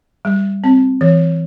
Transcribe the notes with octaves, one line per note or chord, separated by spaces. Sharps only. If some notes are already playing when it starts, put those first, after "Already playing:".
G3
C4
E3